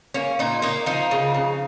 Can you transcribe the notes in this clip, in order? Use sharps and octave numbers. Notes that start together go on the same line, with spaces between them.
A#3 C#4
A#2 D#4
A#3 D#4
F3 D#4
C#3
C#3